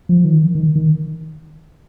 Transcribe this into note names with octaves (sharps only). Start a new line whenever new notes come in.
F3
D#3
D#3
D#3